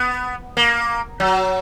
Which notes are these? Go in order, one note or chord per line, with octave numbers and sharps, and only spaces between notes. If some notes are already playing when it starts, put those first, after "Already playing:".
Already playing: B3
A#3
F#3